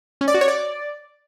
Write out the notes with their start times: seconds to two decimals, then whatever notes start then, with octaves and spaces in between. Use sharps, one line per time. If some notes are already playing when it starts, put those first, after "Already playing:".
0.21 C#4
0.28 D5
0.34 F#4
0.41 C#5
0.48 D5